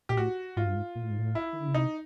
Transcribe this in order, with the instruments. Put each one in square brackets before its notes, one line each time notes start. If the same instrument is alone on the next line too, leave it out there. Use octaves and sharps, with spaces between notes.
[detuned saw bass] A#2 [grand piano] G4
[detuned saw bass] A2 [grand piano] F#4
[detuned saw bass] G#2 [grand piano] F4
[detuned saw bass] G2
G#2
A#2
A2
G#2
A2
[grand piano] E4
[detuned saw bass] D#3
D3
C#3
[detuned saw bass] C3 [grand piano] D#4